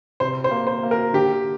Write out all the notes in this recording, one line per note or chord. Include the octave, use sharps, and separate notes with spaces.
C3 C5
C5
A#3
C5
A#3
A#4
D3 G4